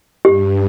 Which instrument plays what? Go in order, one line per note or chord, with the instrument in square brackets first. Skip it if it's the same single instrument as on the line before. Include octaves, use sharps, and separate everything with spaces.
[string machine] G2 [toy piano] G4